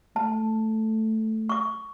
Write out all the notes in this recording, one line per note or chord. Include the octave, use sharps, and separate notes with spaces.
A3 A5
C#6 D6